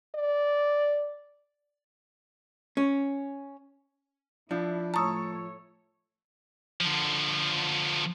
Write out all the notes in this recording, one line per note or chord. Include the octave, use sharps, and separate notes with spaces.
D5
C#4
F3 D4 E4
A2 A3 C#5 A5 A#5 C#6 D#6 E6
D3 F3